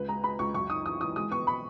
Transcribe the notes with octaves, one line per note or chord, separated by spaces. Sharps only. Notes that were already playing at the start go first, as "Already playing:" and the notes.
Already playing: C#2 B4
G#3 A#5
G#3 B5
C#2 C#6
F#2 C#6
D#4 D#6
E3 D#6
E3 D#6
G#3 D#6
B3 C#6
B5